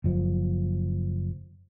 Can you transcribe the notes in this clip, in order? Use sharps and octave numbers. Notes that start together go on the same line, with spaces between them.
F#1 F3